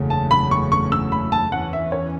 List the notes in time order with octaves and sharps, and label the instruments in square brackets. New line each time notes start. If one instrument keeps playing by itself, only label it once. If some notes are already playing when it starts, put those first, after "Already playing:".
Already playing: [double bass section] F#1 E2 C#3 F#3 A3
[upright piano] A5
B5
C#6
C#6
E6
B5
A5
[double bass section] E2 E3 C#4 [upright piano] F#5
[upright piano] E5
C#5